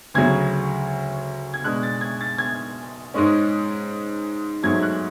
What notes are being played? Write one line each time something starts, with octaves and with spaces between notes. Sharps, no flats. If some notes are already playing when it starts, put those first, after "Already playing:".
D2 C#3 F#3 G#6
G#6
B2 G#3 D4 F#6
A6
G#6
A6
G#6
G#2 G#3 C#4
G#2 F#3 A3 G#6
F#6